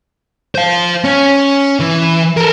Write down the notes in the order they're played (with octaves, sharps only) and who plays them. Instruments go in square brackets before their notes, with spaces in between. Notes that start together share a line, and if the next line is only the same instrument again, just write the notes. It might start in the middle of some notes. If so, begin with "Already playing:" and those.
[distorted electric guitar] C5 F5
C#4
E3
A4 A#4